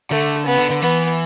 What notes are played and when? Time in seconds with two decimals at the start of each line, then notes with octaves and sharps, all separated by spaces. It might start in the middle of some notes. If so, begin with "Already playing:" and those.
0.11 D3 A3
0.46 C#3 B3
0.58 D3
0.70 D3
0.82 E3 B3